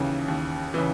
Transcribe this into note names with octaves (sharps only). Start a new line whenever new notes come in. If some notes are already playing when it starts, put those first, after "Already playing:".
Already playing: D#2 C#3 E3
D#2
C#3 E3